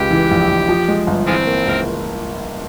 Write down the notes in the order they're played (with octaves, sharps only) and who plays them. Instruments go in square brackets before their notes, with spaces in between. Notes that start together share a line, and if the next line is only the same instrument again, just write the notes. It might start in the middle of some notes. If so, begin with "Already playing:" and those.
Already playing: [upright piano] C#2 [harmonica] G4
[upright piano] E3
A#1
A#1
F3
G#3
G1
[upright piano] E3 [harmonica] F3 G#3 C4
[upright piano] A#3
[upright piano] C#2 [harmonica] A#4